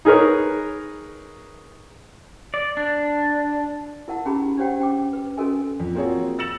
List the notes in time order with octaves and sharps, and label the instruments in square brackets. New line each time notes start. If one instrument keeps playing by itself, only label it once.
[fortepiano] D#4 G#4 A#4 B4 C#5
[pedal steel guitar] D5
D4
[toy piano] E4 A#4 F#5 A5
C#4 D#4 G4 G#4 A#5 B5
D4 G4 C5 C#5 F#5 G5
C#4 G5 D6
B4
C#4 F#4 A4 A#4 D#5 G#5
[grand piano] F2
A#3 C4 F4 F#4 G#4 C#5
E6 A6 A#6 C#7 E7 F#7